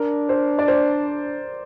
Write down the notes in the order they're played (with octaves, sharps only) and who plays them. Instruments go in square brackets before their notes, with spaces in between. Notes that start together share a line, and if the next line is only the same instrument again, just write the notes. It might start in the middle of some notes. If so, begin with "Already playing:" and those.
Already playing: [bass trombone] D4 [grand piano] A#4
[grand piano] C5
D5
C5